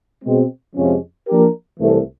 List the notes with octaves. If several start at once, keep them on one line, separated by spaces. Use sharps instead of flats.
B2 G#3 C4
F2 C3 F3 G#3 C#4
F3 A#3 D4 G4 A#4
C2 C3 E3 A3